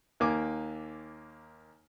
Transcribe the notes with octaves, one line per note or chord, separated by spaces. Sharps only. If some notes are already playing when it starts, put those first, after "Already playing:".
D#2 A#3 G#5 D6